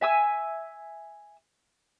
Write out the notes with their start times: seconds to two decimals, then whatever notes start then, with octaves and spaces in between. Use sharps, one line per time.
0.01 E5 G#5 E6